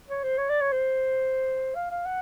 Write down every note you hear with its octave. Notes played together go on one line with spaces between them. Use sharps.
C#5
C5
C#5
D5
C#5
C5
F5
F5
F#5